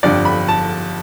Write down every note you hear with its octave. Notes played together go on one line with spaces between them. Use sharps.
G1 F2 D3 G3 D5
B5
A5